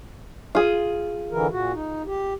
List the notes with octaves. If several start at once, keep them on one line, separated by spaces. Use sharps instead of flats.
F4 G#4
D3 E3 A#4
A#2 F#4
D#4
G4